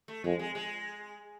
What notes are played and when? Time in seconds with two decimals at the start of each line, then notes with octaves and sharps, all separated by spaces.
0.08 A3
0.24 F2 G#3
0.39 G#3
0.55 G#3